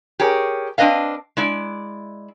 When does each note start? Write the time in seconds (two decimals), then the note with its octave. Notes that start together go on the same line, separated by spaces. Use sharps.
0.19 G4 G#4 A#4 C#5
0.78 C4 D4 B4 D#5 F5
1.37 G#3 E4 D5